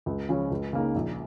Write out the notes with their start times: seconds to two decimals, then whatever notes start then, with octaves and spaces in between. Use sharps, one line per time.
0.06 C#2
0.29 C#3 F3 C#4
0.51 C#2
0.73 C#3 A#3 D#4
0.95 A#1